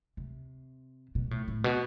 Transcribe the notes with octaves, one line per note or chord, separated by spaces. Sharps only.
C3
B2
A2
A2
B2